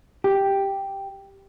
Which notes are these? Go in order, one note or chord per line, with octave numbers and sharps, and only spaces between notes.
G4